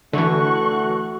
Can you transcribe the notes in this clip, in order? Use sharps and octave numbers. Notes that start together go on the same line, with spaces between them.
D3 E3 A3 F#4 C#6 F#6